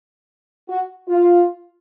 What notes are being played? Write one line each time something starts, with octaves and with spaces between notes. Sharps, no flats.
F#4
F4